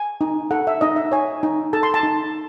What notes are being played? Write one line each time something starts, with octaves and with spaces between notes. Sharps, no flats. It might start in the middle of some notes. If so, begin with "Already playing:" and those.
Already playing: G#5
D#4
A4 F#5
E5
D#4 D#5
E5
C#5 G#5
D#4
A4 A5
C6
A5
D#4